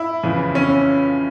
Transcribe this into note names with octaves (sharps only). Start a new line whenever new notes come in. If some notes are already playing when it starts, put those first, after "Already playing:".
Already playing: E4
F2 C#3 E3
C#4